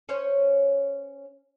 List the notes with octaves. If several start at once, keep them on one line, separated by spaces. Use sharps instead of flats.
C#4 C5 C#5